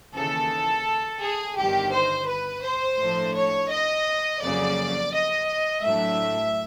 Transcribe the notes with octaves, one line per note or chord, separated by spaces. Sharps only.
D#2 C#3 E3 A4
G#4
G1 G2 D#3 G4
C5
B4
C5
A2 F3 A3 D4
C#5
D#5
F2 C#3 F#3 A#3 D5
D#5
A2 F#3 A3 D4 E5